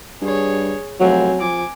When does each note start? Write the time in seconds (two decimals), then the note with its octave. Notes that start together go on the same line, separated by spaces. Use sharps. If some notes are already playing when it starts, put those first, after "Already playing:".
0.21 G2 G#4 C#5
1.00 F1 F#3 C4 G#5
1.41 F3 G#5 D6